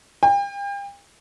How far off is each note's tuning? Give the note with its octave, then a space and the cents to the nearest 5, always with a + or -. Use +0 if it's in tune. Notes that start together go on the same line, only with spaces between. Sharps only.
G5 +40